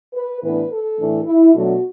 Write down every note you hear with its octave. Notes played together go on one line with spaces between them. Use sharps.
B4
A2 E3 B3 D4 B4
A4
A2 E3 A3 D4
E4
B2 F#3 A3 D4 F#4